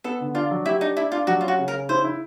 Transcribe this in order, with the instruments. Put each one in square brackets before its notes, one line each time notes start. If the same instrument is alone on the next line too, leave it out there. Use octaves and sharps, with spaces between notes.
[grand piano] B3 [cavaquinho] A4
[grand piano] D3
[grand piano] D4 [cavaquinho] F4
[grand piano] F#3
[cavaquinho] E4 [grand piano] G4
[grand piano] D4 [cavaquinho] D#4
[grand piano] D4 [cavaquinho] E4
[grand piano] D4 [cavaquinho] F4
[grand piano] F#3 [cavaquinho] F#4
[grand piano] C#4 [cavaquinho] F4
[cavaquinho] F#4
[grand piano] C#3
[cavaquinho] A#4
[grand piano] C#3
[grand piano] E4 [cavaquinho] C5
[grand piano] E4